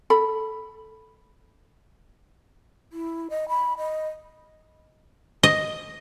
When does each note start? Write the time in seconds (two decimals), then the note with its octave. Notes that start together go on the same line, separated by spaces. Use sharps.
0.10 A4 B5
2.91 E4
3.30 D#5
3.49 B5
3.78 D#5
5.43 D#5